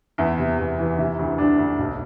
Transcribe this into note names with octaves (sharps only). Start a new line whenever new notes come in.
E2 E4
C3
E2
E3
C3 E4
D2
D2 D4
D2
B1